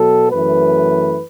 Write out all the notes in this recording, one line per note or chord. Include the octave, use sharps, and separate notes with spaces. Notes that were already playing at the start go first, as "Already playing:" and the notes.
Already playing: B2 F#3 B3 A4
F#2 E3 A3 B4